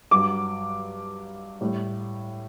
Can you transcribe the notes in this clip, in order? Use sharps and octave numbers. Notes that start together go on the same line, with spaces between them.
G2 F#3 D6
A2 G3